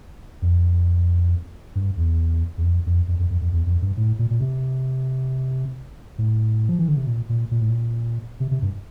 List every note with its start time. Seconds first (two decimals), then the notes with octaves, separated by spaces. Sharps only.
0.42 F2
1.75 G2
1.97 E2
2.57 E2
2.64 F2
2.86 F2
3.08 F2
3.19 F2
3.30 F2
3.41 F2
3.52 E2
3.66 F2
3.82 G2
3.97 A2
4.19 A#2
4.30 A#2
4.41 C3
6.18 A2
6.69 F3
6.79 E3
6.88 D3
6.97 C3
7.06 A#2
7.29 A#2
7.51 A#2
7.61 A2
7.69 A#2
8.40 C3
8.51 C3
8.62 G2